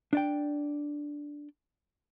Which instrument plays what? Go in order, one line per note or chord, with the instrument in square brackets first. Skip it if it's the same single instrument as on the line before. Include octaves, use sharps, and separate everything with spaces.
[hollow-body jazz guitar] D4 D5 G5